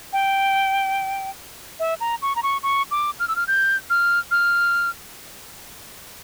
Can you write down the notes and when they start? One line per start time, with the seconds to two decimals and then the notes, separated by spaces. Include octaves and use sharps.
0.13 G5
1.80 E5
2.01 A#5
2.22 C#6
2.36 A#5
2.43 C#6
2.63 C#6
2.91 D6
3.20 F6
3.28 E6
3.36 F6
3.47 G6
3.90 F6
4.31 F6